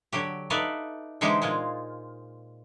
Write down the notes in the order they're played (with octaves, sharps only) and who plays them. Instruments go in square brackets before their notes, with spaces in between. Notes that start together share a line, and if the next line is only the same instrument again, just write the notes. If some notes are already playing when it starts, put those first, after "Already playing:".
[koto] D3 F#3 G4
D#4 A4 B4 D5 E5 F5
D3 E3 G#3 D#4 G4 C5
A#2 G#3 F4